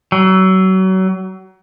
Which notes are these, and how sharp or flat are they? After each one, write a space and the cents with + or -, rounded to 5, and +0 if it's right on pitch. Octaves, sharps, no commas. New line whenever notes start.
F#3 +30